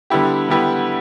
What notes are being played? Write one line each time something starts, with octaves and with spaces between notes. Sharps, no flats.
D3 G3 B3 E4 G4
D3 G3 B3 E4 G4